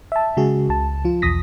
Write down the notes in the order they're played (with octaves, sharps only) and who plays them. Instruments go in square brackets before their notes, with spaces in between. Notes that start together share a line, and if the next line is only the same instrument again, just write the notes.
[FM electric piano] E5 A5
C#3 G#3 F#4 G#4
C#2 A5
F3 F4
B1 E2 D#6 A#6 B6